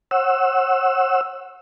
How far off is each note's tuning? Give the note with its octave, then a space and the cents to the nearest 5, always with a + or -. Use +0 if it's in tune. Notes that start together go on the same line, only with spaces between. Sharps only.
C#5 -45 F#5 +0 E6 +0